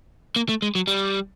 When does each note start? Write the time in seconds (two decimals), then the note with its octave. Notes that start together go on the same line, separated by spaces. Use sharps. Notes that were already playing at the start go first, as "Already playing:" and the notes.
0.36 A#3
0.49 A3
0.62 G#3
0.75 F#3
0.87 G3